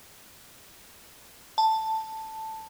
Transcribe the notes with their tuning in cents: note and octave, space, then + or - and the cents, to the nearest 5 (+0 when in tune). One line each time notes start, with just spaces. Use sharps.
A5 +5